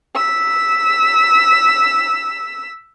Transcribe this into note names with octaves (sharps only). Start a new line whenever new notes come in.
E6 B6